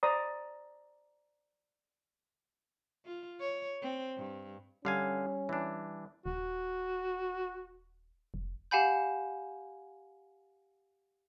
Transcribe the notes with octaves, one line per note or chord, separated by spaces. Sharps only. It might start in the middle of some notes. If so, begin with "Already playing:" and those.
C5 D5 A#5 D#6
F4
C#5
C4
G2
D3 G3 C#4 F5 G#5
E3 D4
D#1 F#4
F1
G4 F5 F#5 G#5 B5 G6